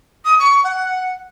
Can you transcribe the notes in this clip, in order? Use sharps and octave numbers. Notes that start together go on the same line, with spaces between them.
D#6
C#6
F#5